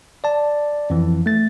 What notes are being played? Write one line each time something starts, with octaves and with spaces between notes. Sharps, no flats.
D5 A5
F2 E3
A3 A6